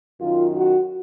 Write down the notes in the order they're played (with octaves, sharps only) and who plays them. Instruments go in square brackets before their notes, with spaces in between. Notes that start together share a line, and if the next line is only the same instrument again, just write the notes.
[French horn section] F#2 D#3 F4
F#4